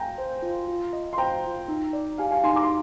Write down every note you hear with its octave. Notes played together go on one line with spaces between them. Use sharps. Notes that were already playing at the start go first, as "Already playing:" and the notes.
Already playing: G5 G#5 A#5
C5
F4
F4
D#5
C6
C5 G5 A#5
F4
D#4
D5
G4 F5 G#5
F5 G#5
D#4 G#5 C6
A#5 D6
C6